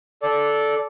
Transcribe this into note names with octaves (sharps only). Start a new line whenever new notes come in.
A4 D5